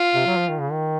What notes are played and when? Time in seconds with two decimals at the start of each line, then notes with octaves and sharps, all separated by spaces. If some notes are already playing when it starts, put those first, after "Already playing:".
Already playing: F4
0.15 C3
0.26 F#3
0.37 F3
0.49 D#3
0.60 C#3
0.72 D#3